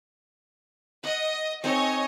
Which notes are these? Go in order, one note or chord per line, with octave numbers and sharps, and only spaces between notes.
D#5 F#5
C4 D#4 A4 C#5 D#5 G#5